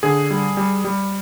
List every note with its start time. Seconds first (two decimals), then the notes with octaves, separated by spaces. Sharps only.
0.03 D3 G#4
0.31 G3
0.57 G3
0.85 G3